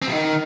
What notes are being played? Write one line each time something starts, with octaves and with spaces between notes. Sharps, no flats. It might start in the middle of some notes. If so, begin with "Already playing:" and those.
C4
B2
D#3